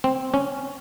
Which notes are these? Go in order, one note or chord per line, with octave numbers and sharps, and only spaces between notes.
C4
C#4